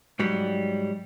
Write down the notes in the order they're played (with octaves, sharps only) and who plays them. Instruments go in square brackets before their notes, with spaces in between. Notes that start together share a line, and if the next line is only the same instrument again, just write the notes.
[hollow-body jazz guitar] G#2 F#3 G3